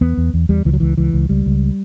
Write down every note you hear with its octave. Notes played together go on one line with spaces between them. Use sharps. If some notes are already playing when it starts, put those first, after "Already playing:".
E2 B3
E2
E2
E2 G3
C#2 E3
F#3
C#2 E3
C#2 E3
C#2
C#2 G3
C#2